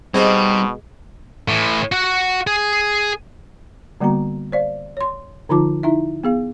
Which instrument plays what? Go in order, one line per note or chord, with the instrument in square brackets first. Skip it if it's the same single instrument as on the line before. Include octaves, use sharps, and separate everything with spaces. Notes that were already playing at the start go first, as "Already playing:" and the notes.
[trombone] B2 [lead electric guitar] G3 [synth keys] C4 D#4 C5 [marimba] G#4 D#5
[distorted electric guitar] A2 E3
F#4 F#5
G#4
[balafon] D3 G3 A#3 B3 F#4 A#5
C5 D5 F5
C#5 C6
D3 F3 D#4 F4 A5 D6
D#4 E4 E5
B3 G#4 F5